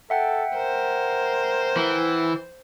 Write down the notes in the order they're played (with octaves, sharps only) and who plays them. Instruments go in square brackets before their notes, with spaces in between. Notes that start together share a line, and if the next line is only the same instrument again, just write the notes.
[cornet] A4 [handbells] E5 F#5 G5
[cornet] A#4 [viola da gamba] C5
[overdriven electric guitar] E3